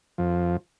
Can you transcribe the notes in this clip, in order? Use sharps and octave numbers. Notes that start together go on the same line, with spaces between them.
F2 F3